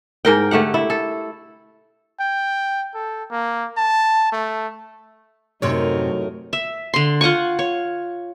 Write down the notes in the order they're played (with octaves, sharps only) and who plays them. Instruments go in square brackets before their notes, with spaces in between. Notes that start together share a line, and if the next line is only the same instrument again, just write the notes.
[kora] G#2 A#4 G5
D3 A3 G4 F#5
E4
A4
[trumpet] G5
A4
A#3
A5
A3
[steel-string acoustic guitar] F#2 C3 [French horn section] A2 F#3 A3 [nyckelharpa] D#4 A#4 [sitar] C#5
[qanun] E5
D3 C6
F4 F#5 G#5 C#6
C#5